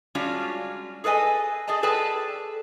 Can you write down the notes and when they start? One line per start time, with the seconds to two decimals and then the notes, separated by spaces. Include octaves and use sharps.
0.15 G3 G#3 C#4 D4 F4 F#4
1.04 G#4 A4 B4 D#5 G#5
1.67 G#4 A4 D5 D#5 A5
1.83 G#4 A4 B4 D5 G5 A5